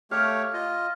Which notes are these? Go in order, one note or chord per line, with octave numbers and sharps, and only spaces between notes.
A3 G4 C#5 F5
F4 D#5